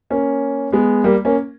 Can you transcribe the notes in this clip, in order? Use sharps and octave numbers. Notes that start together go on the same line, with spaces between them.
A#3 C#4
G#3 B3
G3 A#3
A#3 C#4